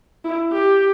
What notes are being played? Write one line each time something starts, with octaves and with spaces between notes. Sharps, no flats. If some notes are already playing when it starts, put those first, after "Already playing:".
E4
G4